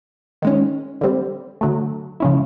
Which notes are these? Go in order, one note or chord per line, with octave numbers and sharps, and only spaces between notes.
D#3 G#3 C#4
D3 G3 C4
D3 F#3 A3
C#3 F3 G#3 C#4 E4